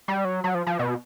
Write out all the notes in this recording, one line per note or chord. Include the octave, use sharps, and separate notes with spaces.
G3
F#3
F#3
F3
F3
B2